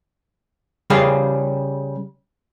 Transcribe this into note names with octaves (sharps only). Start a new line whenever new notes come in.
C#3 G3 G#4 F5